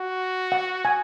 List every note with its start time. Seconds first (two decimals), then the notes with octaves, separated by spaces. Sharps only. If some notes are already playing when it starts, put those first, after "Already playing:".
Already playing: F#4
0.52 F#5
0.85 G#5